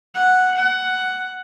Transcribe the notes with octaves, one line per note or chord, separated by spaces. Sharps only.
F#5
F#5